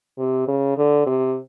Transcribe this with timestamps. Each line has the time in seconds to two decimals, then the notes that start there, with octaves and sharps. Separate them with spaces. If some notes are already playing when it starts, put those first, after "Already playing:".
0.18 C3
0.48 C#3
0.77 D3
1.06 C3